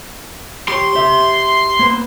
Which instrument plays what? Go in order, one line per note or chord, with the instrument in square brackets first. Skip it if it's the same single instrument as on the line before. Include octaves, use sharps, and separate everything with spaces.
[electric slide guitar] G4 C#5 [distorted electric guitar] C6
[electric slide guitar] G4 C5 E5
A#3 B3 C5